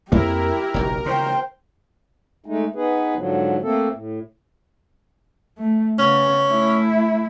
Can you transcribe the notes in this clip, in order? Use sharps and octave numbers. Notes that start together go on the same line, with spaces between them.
F2 A#3 E4 G4 A#4
F#1 B1 F#2 A#4
C#3 C5 G5
G#3 A3 D#4
B3 D#4 G#4 B4
G#2 D3 F3 F#3
A3 A#3 C4 A4
A2
A3
C#3 B3 C#4
A3 E4